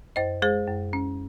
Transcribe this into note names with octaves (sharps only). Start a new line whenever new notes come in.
F#2 C5 D#5
G#3 G#4 C5
F#2
C#4